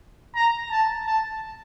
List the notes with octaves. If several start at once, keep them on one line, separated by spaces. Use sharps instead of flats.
A#5
A5
A5